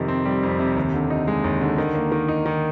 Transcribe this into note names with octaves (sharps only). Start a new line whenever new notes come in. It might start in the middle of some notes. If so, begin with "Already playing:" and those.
Already playing: F2 C3 D#3
C4
G3
F2
C3
D#2
D3
D#4
G#3
D#2
D3
D#3
A#3
D#3
D#4
D#3